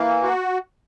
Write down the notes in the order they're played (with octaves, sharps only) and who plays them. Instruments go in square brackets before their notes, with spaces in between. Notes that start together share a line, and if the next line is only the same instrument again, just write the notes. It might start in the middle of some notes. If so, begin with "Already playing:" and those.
Already playing: [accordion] E3 A#3
F#4